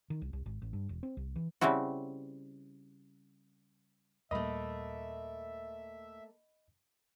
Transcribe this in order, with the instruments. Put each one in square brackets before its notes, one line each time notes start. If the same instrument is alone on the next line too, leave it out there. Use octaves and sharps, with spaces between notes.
[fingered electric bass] D#3
C2
C2
G#1
A1
G2
E1
C4
C2
E3
[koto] C#3 G3 C4 E4 F#4
[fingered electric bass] D#2 A#2 G3 [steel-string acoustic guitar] A3 A#3 [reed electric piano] D#5 B5 [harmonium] E5